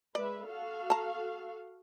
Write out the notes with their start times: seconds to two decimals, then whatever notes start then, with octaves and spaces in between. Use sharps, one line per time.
0.15 G#3 B4 D5 E5
0.48 F#4 A4 F5
0.90 A5 A#5